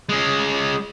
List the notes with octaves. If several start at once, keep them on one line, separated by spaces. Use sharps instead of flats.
G#3 C#4